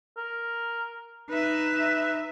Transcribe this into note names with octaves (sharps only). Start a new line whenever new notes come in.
A#4
D#4 B4 E5